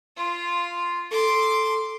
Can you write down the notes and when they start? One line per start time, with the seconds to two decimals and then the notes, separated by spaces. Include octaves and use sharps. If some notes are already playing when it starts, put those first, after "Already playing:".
0.17 F4 C6
1.11 A4 C6 D6